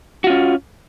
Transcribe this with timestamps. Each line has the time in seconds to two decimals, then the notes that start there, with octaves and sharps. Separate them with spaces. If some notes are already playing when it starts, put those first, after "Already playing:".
0.24 F#4
0.27 F4
0.30 C#4